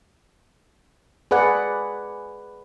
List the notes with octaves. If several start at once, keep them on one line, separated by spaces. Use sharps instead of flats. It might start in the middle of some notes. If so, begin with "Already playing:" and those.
G#4 B4 D5 F#5